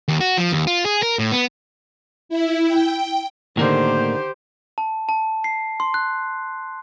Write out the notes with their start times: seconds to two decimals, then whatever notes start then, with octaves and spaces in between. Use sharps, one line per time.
0.08 D#2
0.20 F#4
0.37 F3
0.52 D#2
0.67 F4
0.85 G#4
1.03 A#4
1.19 A2
1.32 B3
2.29 E4
2.67 G5
3.57 A2 D3 D#3 A#3 G4 C5
4.78 A5
5.09 A5
5.44 C7
5.80 C6
5.94 F#6